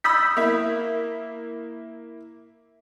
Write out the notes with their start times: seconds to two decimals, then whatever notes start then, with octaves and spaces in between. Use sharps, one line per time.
0.04 B5 D#6 E6 G6 B6
0.37 A#3 E4